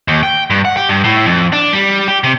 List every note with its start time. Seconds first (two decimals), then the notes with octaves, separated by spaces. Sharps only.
0.08 D#2
0.23 G5
0.50 G2
0.65 F#5
0.77 G4
0.89 G2
1.04 A2
1.25 F2
1.53 D4
1.73 G3
2.08 G4
2.24 C3